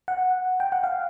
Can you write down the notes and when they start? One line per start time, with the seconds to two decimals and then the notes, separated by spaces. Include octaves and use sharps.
0.08 F#5
0.60 G5
0.72 F#5
0.84 F5